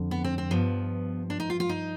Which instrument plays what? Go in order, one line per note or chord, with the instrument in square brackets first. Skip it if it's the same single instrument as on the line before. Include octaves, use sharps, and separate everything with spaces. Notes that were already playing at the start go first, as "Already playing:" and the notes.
Already playing: [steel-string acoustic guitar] F2 D3
B3
C4
C4
G2 F3 B3
D4
D#4
F4
F4
D#4